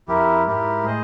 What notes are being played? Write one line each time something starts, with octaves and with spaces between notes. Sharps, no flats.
F2 E4 G4 A#4
G#2 E4 G4 A#4
A2 G#4 C5 D#5